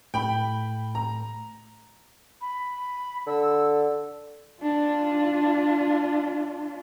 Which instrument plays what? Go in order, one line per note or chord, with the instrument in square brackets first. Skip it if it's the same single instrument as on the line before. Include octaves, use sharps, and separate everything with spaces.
[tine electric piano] A2 A3 [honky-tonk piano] G5 B5
[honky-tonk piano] A#5
[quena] B5
[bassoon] D3 [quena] E6
[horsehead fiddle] D4 F4